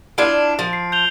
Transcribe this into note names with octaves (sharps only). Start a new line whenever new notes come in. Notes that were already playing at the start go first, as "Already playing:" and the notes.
D4 E4 F4 D7
F3
C7
G6 F7 G7